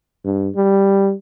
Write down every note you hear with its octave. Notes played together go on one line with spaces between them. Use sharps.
G2
G3